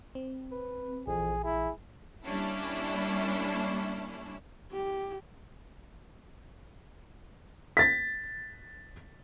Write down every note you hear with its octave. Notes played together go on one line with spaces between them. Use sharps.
C4
B4
A#1 F2 E3 G#4
E4 G#4
G3 A#3 C#4 D4 E4
G4
A6 B6